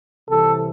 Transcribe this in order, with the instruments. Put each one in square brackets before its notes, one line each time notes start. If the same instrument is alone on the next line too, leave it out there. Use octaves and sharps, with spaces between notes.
[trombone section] C2 C3 E3 A4